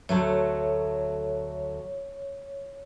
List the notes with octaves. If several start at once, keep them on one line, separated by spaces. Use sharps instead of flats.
D2 F#3 A3 C#5